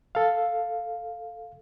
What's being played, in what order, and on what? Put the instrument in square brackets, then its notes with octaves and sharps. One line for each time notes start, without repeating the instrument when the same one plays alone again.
[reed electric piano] A4 F5